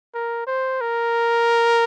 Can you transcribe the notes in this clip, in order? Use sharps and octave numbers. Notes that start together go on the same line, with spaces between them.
A#4
C5
A#4